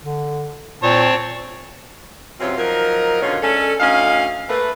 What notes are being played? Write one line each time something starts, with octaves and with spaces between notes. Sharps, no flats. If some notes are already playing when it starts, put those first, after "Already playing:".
D3
A#2 C4 C#5 A5
F#2 C3 E3 C4 F4 C#5
F3 F#3 D#4 A#4
B2 D3 D#3 C#4 F4
G#3 C#4 D4 A4
D2 C#4 D#4 F5
A3 A#3 B4